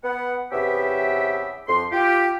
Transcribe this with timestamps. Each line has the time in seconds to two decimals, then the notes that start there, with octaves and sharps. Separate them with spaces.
0.04 B3 F#5
0.52 E2 C3 B3 C#4 G4 E5
1.68 F2 C6
1.92 F4 G4